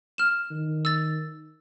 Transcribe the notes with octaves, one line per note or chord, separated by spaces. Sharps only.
F6 E7
D#3
E6 A6